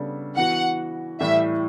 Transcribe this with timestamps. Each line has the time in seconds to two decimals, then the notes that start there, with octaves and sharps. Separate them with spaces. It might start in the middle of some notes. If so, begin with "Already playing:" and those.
Already playing: C#3 G3 B3 D4 A4
0.36 E3 B3 F#4 F#5
1.20 A2 E3 G3 E5